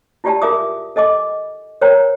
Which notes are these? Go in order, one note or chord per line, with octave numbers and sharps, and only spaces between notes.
E4 F4 G4 D5 G#5 A5
F4 G#4 A#4 E5 D6 D#6
A4 D#5 G#5 D6
A#4 C5 C#5 G5 A#5